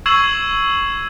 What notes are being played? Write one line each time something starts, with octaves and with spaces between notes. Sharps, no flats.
C#6 E6 G#6 C7 E7 F#7